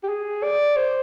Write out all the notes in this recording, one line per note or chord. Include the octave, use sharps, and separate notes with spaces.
G4
G#4
D5
C5